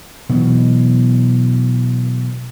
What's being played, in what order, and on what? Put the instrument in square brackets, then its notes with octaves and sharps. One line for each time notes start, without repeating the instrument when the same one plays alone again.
[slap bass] B2 E3 F#3